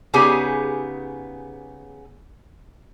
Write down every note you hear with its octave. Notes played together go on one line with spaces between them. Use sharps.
C#3 B3 D#4 G4 G#4 G#5